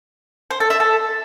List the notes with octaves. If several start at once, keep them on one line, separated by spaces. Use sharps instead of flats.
C5
A4
E5
A4